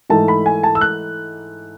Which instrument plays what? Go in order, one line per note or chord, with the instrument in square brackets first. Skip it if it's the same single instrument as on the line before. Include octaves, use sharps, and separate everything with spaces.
[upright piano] G#2 E3 A3 D#4 A5
B5
G#5
A5
E6
F#6